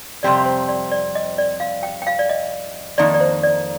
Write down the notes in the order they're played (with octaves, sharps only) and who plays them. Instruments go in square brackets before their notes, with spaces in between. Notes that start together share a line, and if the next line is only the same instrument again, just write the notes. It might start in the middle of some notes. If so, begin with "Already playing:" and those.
[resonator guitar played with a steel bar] F2 C3 G3 C4 G4 [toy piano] D5
[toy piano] C5
D5
D5
D#5
D5
F5
G5
G5
F5
D5
D#5
[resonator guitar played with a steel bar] F2 D#3 A#3 D#4 [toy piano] D5
[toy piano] D5
C5
D5